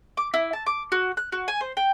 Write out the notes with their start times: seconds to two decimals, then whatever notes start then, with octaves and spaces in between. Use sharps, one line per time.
0.17 D6
0.34 E4
0.53 A5
0.66 D6
0.92 F#4
1.17 F#6
1.32 F#4
1.48 G#5
1.61 C5
1.77 G5